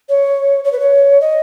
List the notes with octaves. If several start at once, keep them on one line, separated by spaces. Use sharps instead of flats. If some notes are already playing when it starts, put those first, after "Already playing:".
C#5
C#5
B4
C#5
D#5